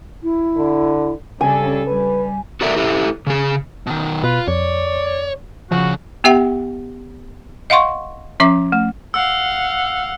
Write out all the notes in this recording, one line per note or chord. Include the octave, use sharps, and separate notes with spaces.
E4
D3
C#3 G3 D4 A4 G#5
G3 B4
F#4 A4 A#4 D5 E5
E4 G4 A4 E5
C#3 G#4
B2 D#3
B2 F4 B4
F2 C#5 D5
C#3 F3 F#4
B3 G4 E5 F#5 G5
D#5 F5 F#5 C6 C#6
F3 C#4 E5 D6
A3
F5 F#5 E6